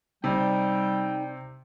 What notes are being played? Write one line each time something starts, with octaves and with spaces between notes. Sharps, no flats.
C3 G3 D#4 D5 G5